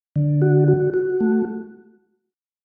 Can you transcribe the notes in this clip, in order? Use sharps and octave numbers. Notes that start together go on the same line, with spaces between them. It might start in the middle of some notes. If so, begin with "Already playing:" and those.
D3
F#4
F#4
F#4
A3